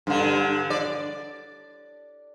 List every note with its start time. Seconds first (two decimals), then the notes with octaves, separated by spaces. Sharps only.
0.07 G2 D3
0.70 D5